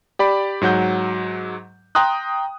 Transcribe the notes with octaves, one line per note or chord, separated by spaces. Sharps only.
G4 D5 B5
G#2 F#3 F#5 G6
G5 A#5 C6 D#6 F#6